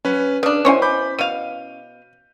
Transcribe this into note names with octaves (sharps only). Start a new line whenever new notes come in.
F#3 C#4 B4
C#3 D4 B4 D#6
B2 C#4 E4 C5 C#5 G#5
B5 D6 G6
B2 F5 D#7